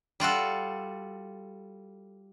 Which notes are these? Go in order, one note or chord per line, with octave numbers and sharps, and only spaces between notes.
G3 F4 F#4 A4